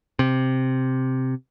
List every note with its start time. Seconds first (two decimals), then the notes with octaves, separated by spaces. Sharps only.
0.19 C3